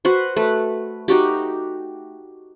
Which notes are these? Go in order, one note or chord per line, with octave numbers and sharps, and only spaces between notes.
F#4 B4 C5
A3 B4
D#4 F#4 G4